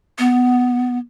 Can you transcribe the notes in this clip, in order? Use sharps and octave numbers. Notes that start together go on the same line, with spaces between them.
B3